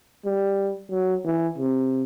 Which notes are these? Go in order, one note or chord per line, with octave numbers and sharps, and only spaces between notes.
G3
F#3
E3
C3